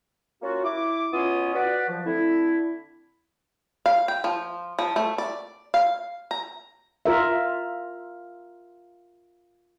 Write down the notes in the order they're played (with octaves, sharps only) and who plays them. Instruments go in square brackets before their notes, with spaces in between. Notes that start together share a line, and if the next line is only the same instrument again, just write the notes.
[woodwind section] A#3 C#4 F4 F#4
E4 D6
B2 B3 C#4 F4 C#5 D#6
F#4 B4 D5
F3
D3 A3 C4 E4
[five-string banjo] F5
G5
F3
F3
A3
D5
F5
A#5
[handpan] F4 A#4 E5